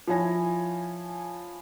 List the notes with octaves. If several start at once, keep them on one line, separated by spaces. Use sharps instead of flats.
F3 E4 C#5 G#5 A#6